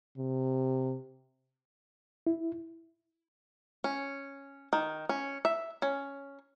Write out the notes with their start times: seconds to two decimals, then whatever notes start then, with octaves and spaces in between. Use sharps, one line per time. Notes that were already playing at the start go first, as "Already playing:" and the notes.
0.18 C3
2.27 E4
3.84 C#4
4.73 D#3
5.09 C#4
5.45 E5
5.82 C#4